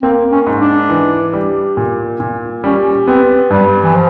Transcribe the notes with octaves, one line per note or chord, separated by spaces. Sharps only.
A#3 C4
C#4
G#2
D4
E3
G3
A#2
A#2
G3 C#4
B3 C4
G2 G3
E3
F3